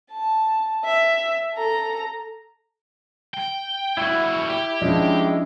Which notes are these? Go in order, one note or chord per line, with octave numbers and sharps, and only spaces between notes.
A5
E5
A4 A#5
G5
G3 E4 F#4
G4
F3 G#3 C#4 D4